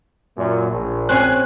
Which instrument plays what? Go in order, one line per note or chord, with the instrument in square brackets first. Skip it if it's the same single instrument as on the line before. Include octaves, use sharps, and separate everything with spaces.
[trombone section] F#2 A#2
A#1
[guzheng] C4 C#4 C5 [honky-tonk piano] G#5 F#6